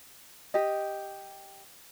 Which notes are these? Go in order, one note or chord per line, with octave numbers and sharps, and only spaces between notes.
G4 D#5